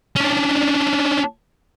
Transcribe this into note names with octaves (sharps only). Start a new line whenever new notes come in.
C#4 D4